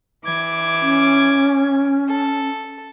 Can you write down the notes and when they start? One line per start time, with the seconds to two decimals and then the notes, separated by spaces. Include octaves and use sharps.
0.25 E3 D6 G#6
0.81 C#4
2.08 A4